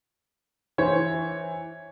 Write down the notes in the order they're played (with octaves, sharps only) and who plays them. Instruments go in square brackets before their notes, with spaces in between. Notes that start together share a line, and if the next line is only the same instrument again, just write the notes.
[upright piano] E3 C5 C#5